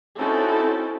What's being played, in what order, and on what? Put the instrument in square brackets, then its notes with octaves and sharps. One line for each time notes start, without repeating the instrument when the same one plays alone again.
[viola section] C4 C#4 D#4 E4 F#4 A4